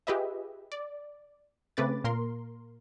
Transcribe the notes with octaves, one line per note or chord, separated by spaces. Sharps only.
F4 G4 G#4 B4 D#5 E5
D5
C#3 A3 C4 B4 D6 A6
A#2 A#3 A#4 C6